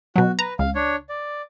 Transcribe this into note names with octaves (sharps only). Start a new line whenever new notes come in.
B2 F#3 F#4
B4 A#5
C#2 F5
D4 C#5
D5